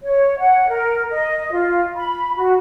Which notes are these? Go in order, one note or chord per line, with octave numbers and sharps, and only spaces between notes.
C#5
F#5
A#4
D#5
F4
B5
F#4